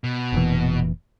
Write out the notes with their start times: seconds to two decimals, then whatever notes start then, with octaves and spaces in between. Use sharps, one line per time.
0.04 B2
0.32 F1 A#2 E3